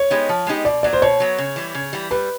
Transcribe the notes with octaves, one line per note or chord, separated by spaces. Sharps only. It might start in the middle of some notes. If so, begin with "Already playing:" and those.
Already playing: C#5
G#3 B3 D#4 G4
F3
G#3 B3 D#4 G4
B2 D5
F#3 B3 D5
C5
B2 C#5
F#3 B3
C#3
E3 G3
C#3
E3 G3
G3 B4